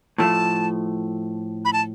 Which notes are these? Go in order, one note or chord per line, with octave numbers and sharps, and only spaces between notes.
A2 F3 A3 A5
B5
A5